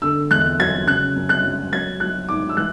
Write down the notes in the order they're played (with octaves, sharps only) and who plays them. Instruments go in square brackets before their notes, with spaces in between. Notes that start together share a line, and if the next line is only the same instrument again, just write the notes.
[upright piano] D3 E6
E2 F#6
F#3 G#6
C#3 F#6
F#2
F#6
F#3
F#3 G#6
F#3 F#6
G#2 D6
E6
E3 F#6